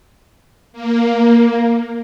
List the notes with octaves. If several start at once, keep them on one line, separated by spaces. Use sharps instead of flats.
A#3